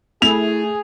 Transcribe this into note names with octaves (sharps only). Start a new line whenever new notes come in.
A3 E4 G#4 F7